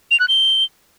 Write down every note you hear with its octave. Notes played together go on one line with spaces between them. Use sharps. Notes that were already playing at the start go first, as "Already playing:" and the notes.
F7
F#6
G7